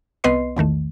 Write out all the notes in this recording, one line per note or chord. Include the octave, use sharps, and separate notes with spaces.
C2 B3 B4 D#5 C6 C7
A#1 E2 D#3 A3